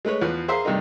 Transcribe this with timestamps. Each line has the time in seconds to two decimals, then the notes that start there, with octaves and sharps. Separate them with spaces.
0.05 G#3 A3 B4 C#5
0.22 E2 F3 B4 F6
0.48 G#4 A#4 C5 E5 F5
0.65 G2 C3 D#3 G3 A3 D#4